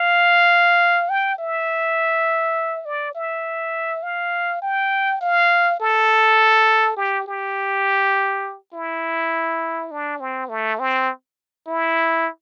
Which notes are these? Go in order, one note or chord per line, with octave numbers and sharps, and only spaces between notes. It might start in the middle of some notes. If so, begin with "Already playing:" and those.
Already playing: F5
G5
E5
D5
E5
F5
G5
F5
A4
G4
G4
E4
D4
C4
A3
C4
E4